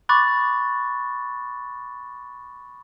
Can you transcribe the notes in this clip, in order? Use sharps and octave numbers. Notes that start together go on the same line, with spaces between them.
B5 C#6 D6 F#6 A6